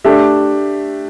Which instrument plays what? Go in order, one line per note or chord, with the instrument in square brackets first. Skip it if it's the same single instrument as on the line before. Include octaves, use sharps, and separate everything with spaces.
[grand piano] A3 D4 G4 E5